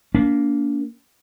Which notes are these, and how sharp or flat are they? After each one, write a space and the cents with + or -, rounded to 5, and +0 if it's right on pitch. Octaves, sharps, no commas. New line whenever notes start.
A#3 +0 D4 -40